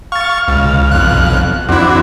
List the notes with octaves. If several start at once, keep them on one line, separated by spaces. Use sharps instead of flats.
F5 C#6 A6
C#2
B1 F2 F#6
F2 C4 D4 E4 F#4